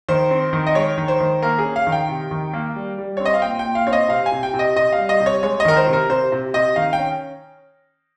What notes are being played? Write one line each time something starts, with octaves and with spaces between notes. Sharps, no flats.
D#3 C5
C4
D#3
D#5
G#3 C#5
D#3
C5
D#3
A#3 A#4
G#4
C#4
F5
D#3
G5
C3
D#3
A#3
G3
G3
C4 C#5
D#5
F5
A#2 G5
G5
A#2
F5
C4 C#5
D#5
C3 F5
G#5
C3
G5
C3
D#5
C3 D#5
F5
G3
D#5
C3
C#5
G#3 C#5
D#5
D#3 A#4
C5
C3
A#4
C3 C5
C3
C3 D#5
D#3 F5
G5
C#4